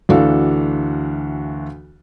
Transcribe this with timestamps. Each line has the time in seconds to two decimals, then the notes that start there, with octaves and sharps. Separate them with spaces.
0.09 D2 E3 D4 F#4 A4 F5